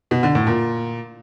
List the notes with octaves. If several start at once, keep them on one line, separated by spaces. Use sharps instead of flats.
B2
D3
A2
A#2